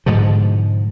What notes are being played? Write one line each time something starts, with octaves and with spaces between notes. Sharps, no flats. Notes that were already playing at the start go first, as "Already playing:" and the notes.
G#2 B2 D3 F3